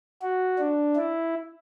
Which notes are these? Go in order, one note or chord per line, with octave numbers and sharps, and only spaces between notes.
F#4
D4
E4